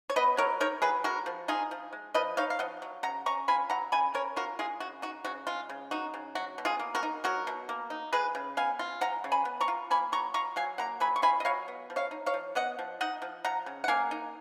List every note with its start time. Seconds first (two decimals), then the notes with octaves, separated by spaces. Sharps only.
0.10 C#5
0.16 B3 B4 D#5
0.37 F#3 A#4 C#5
0.60 D#4 A#4 C#5
0.82 F#3 G#4 B4
1.04 G#3 F#4 A#4
1.26 F3
1.48 D#4 F4 G#4
1.71 F3
1.92 G#3
2.14 F3 B4 D#5
2.37 D#4 C#5 F5
2.50 F5
2.59 F3 D#5 F#5
2.82 F#3
3.03 C#3 F#5 A#5
3.26 C#4 A#5 C#6
3.48 F4 G#5 B5
3.70 F#3 F#5 A#5
3.92 C#3 G#5 B5
4.14 C#4 A#4 C#5
4.36 F4 F#4 A#4
4.59 G#3 F4 G#4
4.80 C#3 F#4
5.02 D#4 F#4
5.24 C#3 F#4
5.47 G#3 F4
5.69 C#3
5.91 D#4 F#4
6.14 C#3
6.35 F#3 F#4
6.58 B2
6.65 F4 G#4
6.80 A#3
6.95 F#4 A#4
7.03 D#4
7.24 F#3 F#4 A#4
7.47 B2
7.69 A#3
7.90 D#4
8.13 G#3 G#4 B4
8.35 C#3
8.57 B3 F5 G#5
8.79 F4
9.01 G#3 F#5 A#5
9.24 C#3
9.32 G#5 B5
9.45 B3
9.61 A#5 C#6
9.68 F4
9.91 A#3 G#5 B5
10.12 F#3 A#5 C#6
10.34 F4 A#5 C#6
10.56 F#3 F5 G#5
10.78 A#3 F#5 A#5
11.00 F#3 G#5 B5
11.16 C#6
11.22 F4 G#5 B5
11.40 D#5
11.45 F#3 C#5 F5
11.68 B3
11.90 F3
11.96 C#5 F5
12.11 D#4
12.26 C#5 F5
12.34 F3
12.55 B3 D#5 F#5
12.79 F3
13.01 D#4 D#5 F#5
13.22 F3
13.45 F3 F#5 A#5
13.66 C#3
13.84 F#5
13.88 A#3 F5 G#5
14.11 D#4